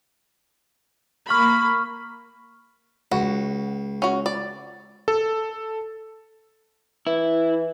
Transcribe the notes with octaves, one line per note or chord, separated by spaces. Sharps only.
A#3 B5 C#6 F6
C#2 F#4
C#4 F#4
D5
A4
E3 E4